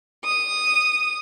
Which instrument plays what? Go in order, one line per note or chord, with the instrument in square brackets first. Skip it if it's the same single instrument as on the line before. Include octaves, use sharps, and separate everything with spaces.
[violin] D#6